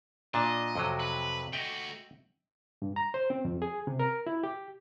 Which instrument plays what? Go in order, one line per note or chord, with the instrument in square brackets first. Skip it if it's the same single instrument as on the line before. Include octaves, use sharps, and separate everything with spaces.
[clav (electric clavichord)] A#2 D4 A5 [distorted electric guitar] D#5
[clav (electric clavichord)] F2 C3 F#3
[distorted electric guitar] B4
[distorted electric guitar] A3 F#4 [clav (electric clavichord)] D#5 E5 G5
[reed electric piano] G2
A#5
C5
C4
F2
G#4
C3
A#4
E4
G4